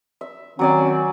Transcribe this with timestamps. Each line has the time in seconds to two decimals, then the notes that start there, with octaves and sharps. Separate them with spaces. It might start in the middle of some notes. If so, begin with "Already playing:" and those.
0.21 E5
0.59 D#3 F#3 C4 C#4 D5 G#5